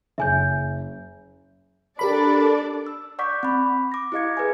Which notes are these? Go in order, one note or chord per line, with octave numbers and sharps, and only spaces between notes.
F#1 E5 G#5 G6
D4 G4 A4 A#4 D5 B5
E6
D5 F#5 C#6 D6 G6 B6
C4 B5
D6 A#6
E4 G4 D#5 F5 G#6 C#7
G#4 B4 D5 E5 G#5